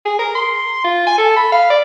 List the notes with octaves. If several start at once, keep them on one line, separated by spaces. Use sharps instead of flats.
G#4
A#4
C6
F4
G#5
A4
B5
F5
D5